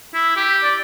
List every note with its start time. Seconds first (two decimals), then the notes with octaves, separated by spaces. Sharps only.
0.14 E4
0.36 G4
0.64 D5